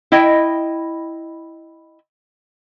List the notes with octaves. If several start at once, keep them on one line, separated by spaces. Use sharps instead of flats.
E4 D#5 G5